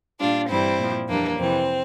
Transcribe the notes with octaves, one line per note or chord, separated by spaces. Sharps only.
A#2 G3 D4 F4
G2 E3 G3 C4 E4
A#2 F3
F2 E3 G3 A#3 D4
F2 C3 E3 G3 C4